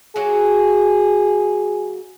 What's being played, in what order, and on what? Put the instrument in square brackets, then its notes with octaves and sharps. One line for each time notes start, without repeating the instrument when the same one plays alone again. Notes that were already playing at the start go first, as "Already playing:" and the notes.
[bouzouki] F#3 A#3 F#4 [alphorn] G#4